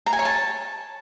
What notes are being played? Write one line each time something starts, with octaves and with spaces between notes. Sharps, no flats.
A#5
G#5
C#5
A5